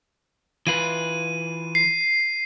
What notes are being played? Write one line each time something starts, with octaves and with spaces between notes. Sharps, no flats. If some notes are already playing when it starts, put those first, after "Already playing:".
E3 F4 B4 D#7
C7